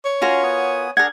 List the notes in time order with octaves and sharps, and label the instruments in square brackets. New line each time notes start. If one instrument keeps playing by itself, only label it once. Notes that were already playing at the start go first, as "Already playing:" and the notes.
[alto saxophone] C#5
[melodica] C#4 G#5 C6 [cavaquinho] F4 F#4 A#4
[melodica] B3 G#5 D#6
[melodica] D4 G#4 [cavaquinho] A#4 F#5 [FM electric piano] G#6